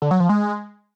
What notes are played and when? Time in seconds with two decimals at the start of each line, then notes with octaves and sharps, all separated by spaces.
0.02 D3
0.11 F#3
0.20 F3
0.29 G#3